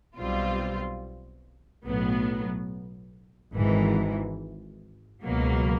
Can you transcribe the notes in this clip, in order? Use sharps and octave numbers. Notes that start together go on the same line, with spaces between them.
B1 B2 G3 C4 F4
B1 A2 F#3 B3
G#1 G#2 E3
C#2 B2 F#3 A#3